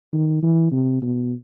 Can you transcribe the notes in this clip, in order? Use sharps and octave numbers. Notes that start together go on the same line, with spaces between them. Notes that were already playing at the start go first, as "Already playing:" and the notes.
D#3
E3
C3
B2